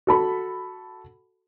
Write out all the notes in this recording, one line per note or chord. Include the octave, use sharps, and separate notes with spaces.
F#4 A4 B5